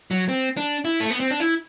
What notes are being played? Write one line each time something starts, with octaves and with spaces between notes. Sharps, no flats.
F#3
C4
D4
E4
A3
B3
C4
D4
E4